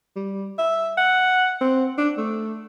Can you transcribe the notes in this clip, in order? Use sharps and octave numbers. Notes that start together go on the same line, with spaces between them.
G3
E5
F#5
C4
D4
A3